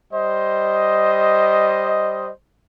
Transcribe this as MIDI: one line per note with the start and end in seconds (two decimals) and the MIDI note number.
0.13 2.30 55
0.13 2.30 72
0.13 2.30 75